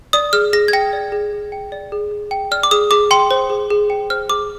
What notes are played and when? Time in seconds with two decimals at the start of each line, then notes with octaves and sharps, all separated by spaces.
0.13 D5 D#6
0.33 G#4 F6
0.53 G#4 A#6
0.68 G#6
0.73 G5 A#6
0.93 D5
1.12 G#4
1.33 G#4
1.52 G5
1.72 D5
1.92 G#4
2.11 G#4
2.31 G5
2.51 D5 F6
2.63 D6
2.71 G#4 D#6
2.91 G#4 D6
3.11 G5 C6
3.31 C5
3.50 G#4
3.70 G#4
3.90 G5
4.10 C5 F6
4.30 G#4 D6